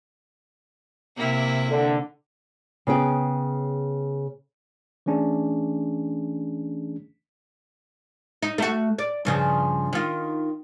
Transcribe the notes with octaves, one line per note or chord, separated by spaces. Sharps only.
C3 A#3 E4
D3
C#3 B3 G#4 G5
E3 A3 C#4 D4 G#4
D#4
A3 F#4
D5
G2 C#3 F3
D#3 F4